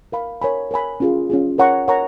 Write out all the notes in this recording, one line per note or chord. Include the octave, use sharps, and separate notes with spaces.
A#4 F5 B5
A#4 C#5 G#5 B5
A#4 C#5 G#5 B5
C#4 F4 G#4
C#4 F4 G#4
A#4 C#5 F#5 A#5 C#6
A#4 C#5 F#5 A#5 C#6